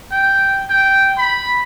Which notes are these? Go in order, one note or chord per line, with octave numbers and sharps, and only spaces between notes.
G5
G5
B5